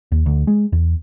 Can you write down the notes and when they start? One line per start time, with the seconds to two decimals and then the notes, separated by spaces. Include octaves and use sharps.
0.12 D#2
0.26 D2
0.47 G#3
0.72 E2